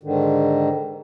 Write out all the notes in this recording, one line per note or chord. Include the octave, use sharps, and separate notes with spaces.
G#2 D3 D#3